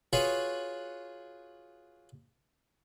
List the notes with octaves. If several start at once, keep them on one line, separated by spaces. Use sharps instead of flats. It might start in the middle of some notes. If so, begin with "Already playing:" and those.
F4 F#4 G#4 B4 C#5 F#5